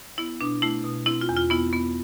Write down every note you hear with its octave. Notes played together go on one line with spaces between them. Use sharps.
B3 E4
B2 D4
A3 E4
B2
C4 E4
F4
E2
F4
B3 E4
B3